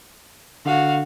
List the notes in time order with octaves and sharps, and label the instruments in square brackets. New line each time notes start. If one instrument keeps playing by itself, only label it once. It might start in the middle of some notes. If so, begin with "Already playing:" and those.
[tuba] D3 [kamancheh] F#4 F5